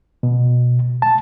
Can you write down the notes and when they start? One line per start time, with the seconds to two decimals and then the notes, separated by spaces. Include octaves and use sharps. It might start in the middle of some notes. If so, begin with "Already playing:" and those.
0.23 B2
1.02 A5